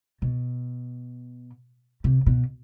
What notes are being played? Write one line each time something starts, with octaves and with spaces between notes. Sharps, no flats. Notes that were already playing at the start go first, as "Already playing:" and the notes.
B2
C3
B2